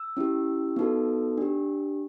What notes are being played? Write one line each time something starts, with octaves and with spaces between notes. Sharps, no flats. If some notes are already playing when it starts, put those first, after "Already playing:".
Already playing: E6
C#4 E4 G4
B3 D#4 F#4 A4
D4 G4